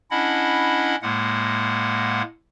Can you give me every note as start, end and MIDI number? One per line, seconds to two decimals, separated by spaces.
0.11 0.96 61
0.11 0.96 62
0.11 0.96 64
0.11 0.96 75
0.11 0.96 78
0.11 0.96 83
1.02 2.22 45
1.02 2.22 56
1.02 2.22 58
1.02 2.22 78